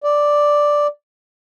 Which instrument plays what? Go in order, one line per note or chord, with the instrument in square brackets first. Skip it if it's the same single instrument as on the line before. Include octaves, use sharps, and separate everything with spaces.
[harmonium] D5